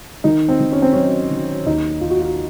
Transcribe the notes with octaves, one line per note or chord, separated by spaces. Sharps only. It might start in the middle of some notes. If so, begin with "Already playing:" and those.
D#3 D#4
C4
D#3
C#4
C4
F#3 C#4
D#3
D#2 D#4
D#2 F4
F#4
F4